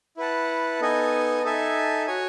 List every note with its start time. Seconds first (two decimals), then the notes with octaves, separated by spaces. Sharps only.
0.17 E4 B4 F#5 A5
0.81 B3 D#4 A4 D#5 G#5
1.43 D#4 A4 E5 G#5
2.07 F#4 C#5 G#5